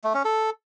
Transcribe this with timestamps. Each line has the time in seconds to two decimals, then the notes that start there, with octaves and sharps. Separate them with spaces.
0.04 A3
0.14 C#4
0.25 A4